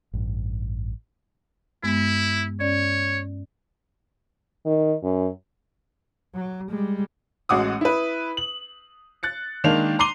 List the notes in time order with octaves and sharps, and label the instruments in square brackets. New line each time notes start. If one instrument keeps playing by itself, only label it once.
[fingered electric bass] A1 G2
[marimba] G2 G#3 B3 [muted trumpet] E4
[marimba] G2 C#4 D5 [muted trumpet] C#5
[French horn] D#3
F#2
[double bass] F#3
G3 G#3
[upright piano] A1 G#3 F#4 D6 D#6
E4 B4
F#7
F#6 A6 C#7
D#3 G#3 A#3 D4 A5 F7
A#5 C6 D6 C7 D#7 G7